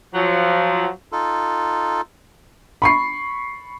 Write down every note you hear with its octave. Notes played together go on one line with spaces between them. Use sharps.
F3 F#3
D#4 F4 A4
B5 C#6 C7